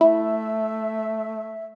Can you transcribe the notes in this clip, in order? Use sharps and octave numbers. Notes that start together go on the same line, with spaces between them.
A3 E4 E5